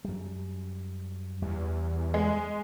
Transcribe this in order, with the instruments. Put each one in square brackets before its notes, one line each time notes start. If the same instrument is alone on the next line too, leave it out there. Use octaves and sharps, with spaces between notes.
[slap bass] F#2 G3
[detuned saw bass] E2 [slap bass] G3
[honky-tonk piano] G#3